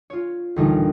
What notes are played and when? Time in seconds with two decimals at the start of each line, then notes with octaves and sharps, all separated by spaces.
0.10 F4 C#5
0.56 A1 D2 A#2 D3 G3 D#4